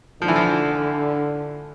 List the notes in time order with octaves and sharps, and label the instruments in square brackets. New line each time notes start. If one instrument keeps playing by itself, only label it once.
[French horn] D3 [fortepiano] F3
[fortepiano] E3
F3